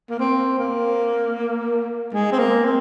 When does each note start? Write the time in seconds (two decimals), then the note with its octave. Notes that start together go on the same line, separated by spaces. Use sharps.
0.10 A#3
0.19 C4
0.59 A#3
2.13 G#3
2.32 C4
2.39 A#3
2.64 C4